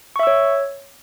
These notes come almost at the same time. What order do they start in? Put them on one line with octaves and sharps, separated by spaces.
C#6 E5 E6 C#5